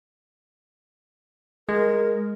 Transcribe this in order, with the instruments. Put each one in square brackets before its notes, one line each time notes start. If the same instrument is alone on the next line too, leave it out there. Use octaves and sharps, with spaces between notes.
[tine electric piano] G#3 [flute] A#4